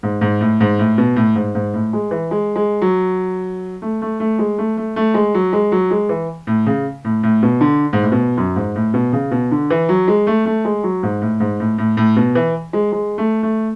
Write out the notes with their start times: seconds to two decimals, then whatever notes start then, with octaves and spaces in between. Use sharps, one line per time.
0.03 G#2
0.21 G#2
0.41 A2
0.61 G#2
0.79 A2
0.98 B2
1.16 A2
1.35 G#2
1.55 G#2
1.74 A2
1.93 G#3
2.11 E3
2.31 G#3
2.56 G#3
2.81 F#3
3.82 A3
4.02 A3
4.20 A3
4.39 G#3
4.58 A3
4.77 A3
4.96 A3
5.14 G#3
5.34 F#3
5.53 G#3
5.72 F#3
5.91 G#3
6.09 E3
6.47 A2
6.66 C#3
7.05 A2
7.23 A2
7.43 B2
7.61 D3
7.93 G#2
8.02 A2
8.12 B2
8.37 F#2
8.56 G#2
8.76 A2
8.94 B2
9.13 C#3
9.31 B2
9.51 D3
9.70 E3
9.89 F#3
10.08 G#3
10.27 A3
10.46 A3
10.65 G#3
10.83 F#3
11.03 G#2
11.22 A2
11.40 G#2
11.60 A2
11.78 A2
11.97 A2
12.16 B2
12.35 E3
12.73 G#3
12.92 G#3
13.18 A3
13.43 A3